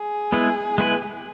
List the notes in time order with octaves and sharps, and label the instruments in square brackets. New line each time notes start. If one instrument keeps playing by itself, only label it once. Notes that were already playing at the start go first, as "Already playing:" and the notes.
Already playing: [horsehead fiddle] G#4
[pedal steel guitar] G#3 B3 E4 B4
G#3 B3 E4 B4